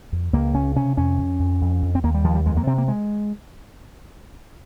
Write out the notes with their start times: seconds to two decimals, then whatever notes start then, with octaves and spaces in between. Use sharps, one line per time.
0.12 F2
0.33 C#2 A#3
0.54 C#3 C#4
0.76 C3 C#4
0.97 F2 C#4
1.18 F2
1.39 F2
1.61 F2
1.82 F2
1.95 C4
2.04 D#2 A#3
2.14 G3
2.24 D#2 F3
2.35 G3
2.46 F2 G#3
2.57 A#3
2.67 C3 C4
2.78 A#3
2.88 G#3